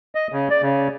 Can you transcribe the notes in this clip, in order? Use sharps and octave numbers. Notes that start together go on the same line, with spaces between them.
D#5
C#3
D5
C#3